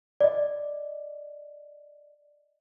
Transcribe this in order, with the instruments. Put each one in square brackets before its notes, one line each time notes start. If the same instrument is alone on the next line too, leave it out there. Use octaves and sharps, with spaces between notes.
[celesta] D5 D#5